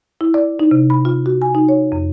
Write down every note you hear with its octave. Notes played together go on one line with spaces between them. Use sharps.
E4
D5
D#4
C3
B5
F4
F#4
G#5
D#4
C#5
F2